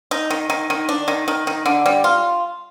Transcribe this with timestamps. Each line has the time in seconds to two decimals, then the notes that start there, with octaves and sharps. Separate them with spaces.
0.11 D#4
0.30 D#3
0.50 D#3
0.70 D#3
0.89 D4
1.08 D#3
1.28 D#3
1.47 D#3
1.66 D3
1.86 G3
2.04 F4